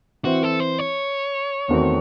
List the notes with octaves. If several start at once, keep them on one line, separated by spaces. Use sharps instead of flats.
E3 C4 E4 F#4
A4
C5
C#5
E2 D#3 A3 C4 F#4